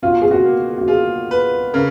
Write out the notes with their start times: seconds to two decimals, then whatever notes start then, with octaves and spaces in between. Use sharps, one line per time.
0.02 B2 F4
0.21 G#4
0.31 F#4
0.45 A#3
0.78 F#4
0.88 F4 G#4
1.31 B4
1.73 C#3 A#4